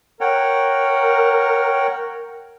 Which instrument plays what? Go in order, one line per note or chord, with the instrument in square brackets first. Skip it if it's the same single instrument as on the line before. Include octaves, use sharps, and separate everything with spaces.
[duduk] A#4 [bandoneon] C#5 F#5 G5